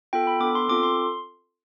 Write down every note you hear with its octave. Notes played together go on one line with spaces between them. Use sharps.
B3 F4 A4 G5
B5
B3 D4 A4 D6
C6
C4 F4 A4 D6
C6